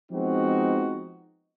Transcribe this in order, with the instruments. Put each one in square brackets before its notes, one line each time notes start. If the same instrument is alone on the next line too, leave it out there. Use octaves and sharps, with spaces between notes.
[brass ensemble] F3 G#3 B3 C4 D#4 F#4